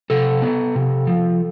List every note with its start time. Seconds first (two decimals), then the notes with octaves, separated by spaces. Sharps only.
0.10 C3 A4
0.42 B3
0.75 C3
1.07 F3